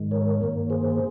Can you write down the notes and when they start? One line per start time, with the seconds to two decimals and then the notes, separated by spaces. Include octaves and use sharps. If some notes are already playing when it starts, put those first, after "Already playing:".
Already playing: G#2 D#3 G#3
0.11 A#4 C#5
0.41 G2 D#3 A#3
0.70 G#4 C5